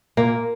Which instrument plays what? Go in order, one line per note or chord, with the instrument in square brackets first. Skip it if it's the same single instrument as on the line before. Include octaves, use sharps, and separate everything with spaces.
[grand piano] A#2 [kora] A#3